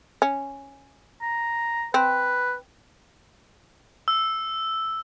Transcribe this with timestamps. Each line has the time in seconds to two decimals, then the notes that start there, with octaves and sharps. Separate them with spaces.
0.22 C#4
1.22 A#5
1.94 C4 B4
4.08 E6